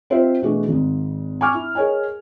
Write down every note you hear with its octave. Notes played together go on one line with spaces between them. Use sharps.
C4 F4 G4 C5 D#5 E5
B2 E3 A3 D4 F#4 G#4
G#1 G#2
G#5 C#6 D6 F6
E4
G#4 A#4 C#5 D#5 G#5